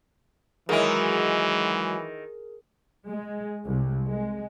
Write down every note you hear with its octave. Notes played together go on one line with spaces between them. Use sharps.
D#3 E3 F#3 G#3 E4 G#4 A#4
G#3
C2
G#3